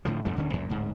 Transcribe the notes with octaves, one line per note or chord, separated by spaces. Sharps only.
A2 D3 F3
F2 G#2 C3 A3
D1 D3 C#4
C#2 F#2 A#2
D1 G#2